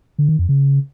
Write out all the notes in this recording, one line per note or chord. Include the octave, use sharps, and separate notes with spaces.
D3
D#3
F2
C#3